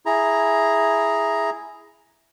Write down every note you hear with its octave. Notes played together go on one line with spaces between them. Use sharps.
E4 G#4 A#5